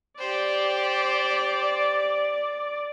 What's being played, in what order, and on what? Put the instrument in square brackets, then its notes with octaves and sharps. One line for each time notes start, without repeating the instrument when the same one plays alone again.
[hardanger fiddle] G4 C5 [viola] D5